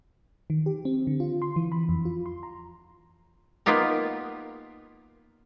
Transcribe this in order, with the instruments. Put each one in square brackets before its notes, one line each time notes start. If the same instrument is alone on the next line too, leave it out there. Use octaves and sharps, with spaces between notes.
[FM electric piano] D#3
G4
C4
D3
F4
C6
E3
B5
F2
F4
C6
A#5
[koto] A#3 B3 D#4 F4 G4 A#4